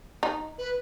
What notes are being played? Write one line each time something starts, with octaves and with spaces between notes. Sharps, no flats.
D#4
B4